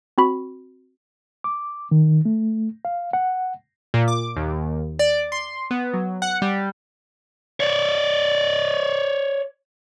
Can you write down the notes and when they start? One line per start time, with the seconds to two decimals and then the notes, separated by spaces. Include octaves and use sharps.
0.18 C4 F#4 B5
1.44 D6
1.91 D#3
2.25 A3
2.85 F5
3.13 F#5
3.94 A#2
4.08 D6
4.36 D#2
4.99 D5
5.32 C6
5.71 B3
5.94 F#3
6.22 F#5
6.42 G3
7.60 C#5 D5